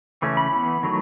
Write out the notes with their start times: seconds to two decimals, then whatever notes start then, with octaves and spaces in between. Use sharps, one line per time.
0.22 C#3 E3 A3 C#4
0.37 B5
0.53 E3 B3
0.83 D#3 F#3 A3